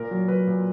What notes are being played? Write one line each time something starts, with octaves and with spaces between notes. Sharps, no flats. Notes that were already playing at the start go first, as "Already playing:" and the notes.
Already playing: A#2 A#4
F#3
F#3 B4
A#2